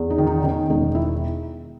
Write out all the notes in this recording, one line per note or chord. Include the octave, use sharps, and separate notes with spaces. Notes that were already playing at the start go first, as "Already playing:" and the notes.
Already playing: E2
D#4
D#3
D#4
D#3 C#4
E1 D#4
E4